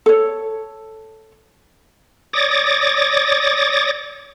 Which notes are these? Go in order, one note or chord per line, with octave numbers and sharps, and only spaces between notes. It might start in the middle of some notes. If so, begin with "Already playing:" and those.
A4 C#5
C#5 D5 D6 D#6 A6 A#6